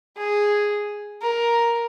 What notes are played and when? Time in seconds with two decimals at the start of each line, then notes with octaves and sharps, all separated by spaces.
0.17 G#4
1.22 A#4